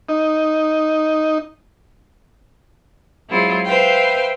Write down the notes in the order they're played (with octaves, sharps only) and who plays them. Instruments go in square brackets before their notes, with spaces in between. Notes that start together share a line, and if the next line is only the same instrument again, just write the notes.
[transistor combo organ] D#4
[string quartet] F#3 G#3 C4 E4 F4 G#4
B4 C5 E5 F5 G5